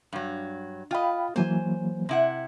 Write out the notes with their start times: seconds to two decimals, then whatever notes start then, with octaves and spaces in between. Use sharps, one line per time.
0.13 G2 F#3
0.91 F4 D#5 F5 G5 B5
1.36 E3 F#3 A#3 C5 G#5
2.09 C3 E4 F#5